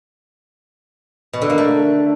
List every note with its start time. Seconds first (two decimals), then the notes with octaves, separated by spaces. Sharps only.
1.33 B2
1.42 D3
1.50 A#3
1.58 A3